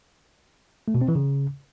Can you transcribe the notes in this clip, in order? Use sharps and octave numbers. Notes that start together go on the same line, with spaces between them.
A3
B2
C4
E3
C#3